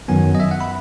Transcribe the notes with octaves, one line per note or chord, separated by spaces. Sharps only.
F#2 D#3 F#3 B3 G#5
D#5
E5
F#5
B5